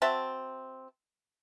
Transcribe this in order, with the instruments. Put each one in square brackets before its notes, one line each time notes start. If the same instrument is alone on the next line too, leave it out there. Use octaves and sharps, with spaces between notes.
[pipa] C4 F#4 E5 A5